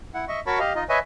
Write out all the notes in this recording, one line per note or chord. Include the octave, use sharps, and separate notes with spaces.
E4 F#5
D#5 E5 C#6
F#4 A#4 C#5 A5 B5 C#6
G4 D#5 F5
D#4 F4 D#5
B4 C#5 D#5 E5 G#5